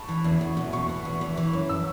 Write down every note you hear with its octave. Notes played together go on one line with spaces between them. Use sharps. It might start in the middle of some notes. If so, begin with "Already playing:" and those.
Already playing: A5 B5 C#6
E3
E2
E2
B2
B2 C#6
B3
E2
E3
E3
F#2
E6